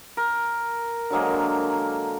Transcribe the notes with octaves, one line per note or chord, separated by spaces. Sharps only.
A#4
D3 F#3 G#3 A#3